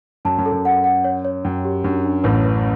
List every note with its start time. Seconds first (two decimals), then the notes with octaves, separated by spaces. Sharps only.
0.25 F#2 A5
0.38 F#2
0.45 A4
0.52 F#2
0.65 F#5
0.84 F#5
1.04 C#5
1.25 C#5
1.45 F#2 G5
1.64 G4
1.84 F#2 D4
2.04 D4
2.24 A1 A2 B4
2.44 B4